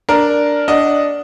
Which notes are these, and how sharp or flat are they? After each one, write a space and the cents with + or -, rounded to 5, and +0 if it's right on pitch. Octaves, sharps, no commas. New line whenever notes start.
D4 +0 A#4 +0
D4 -10 D#5 +0 F#5 +0